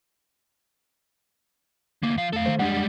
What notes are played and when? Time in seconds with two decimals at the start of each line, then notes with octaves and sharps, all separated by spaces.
2.03 D2 A#3
2.17 F3 F5
2.33 F2 A3 A4 F5
2.46 D#3 A3 C5
2.59 F2 G3 G#3 D4 F#5